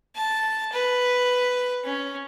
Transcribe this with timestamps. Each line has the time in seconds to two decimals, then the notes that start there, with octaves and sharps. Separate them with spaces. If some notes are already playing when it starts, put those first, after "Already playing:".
0.16 A5
0.73 B4
1.85 C#4